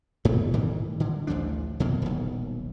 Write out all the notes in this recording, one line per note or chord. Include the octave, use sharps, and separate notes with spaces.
G2 B2 A3
A2 D#3 E3 G3
D3
A1 D2 F3 D4
F2 B2 A#3
D#1 B1